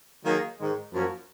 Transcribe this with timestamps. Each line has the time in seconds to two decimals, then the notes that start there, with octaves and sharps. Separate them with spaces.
0.23 D#3 F#3 A#3 D#4 G#4
0.58 G#2 D#3 G#3
0.92 F#2 F3 A#3 C#4 F#4